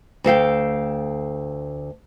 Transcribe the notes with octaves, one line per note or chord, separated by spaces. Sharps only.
D2 A4 F5 G5